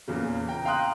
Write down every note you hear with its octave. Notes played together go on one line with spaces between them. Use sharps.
E2 A#2 C#3
G5 A#5
F5 G5 A#5 C6 D#6 F#6